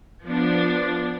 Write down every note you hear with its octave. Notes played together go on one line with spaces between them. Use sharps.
F3 B3 D4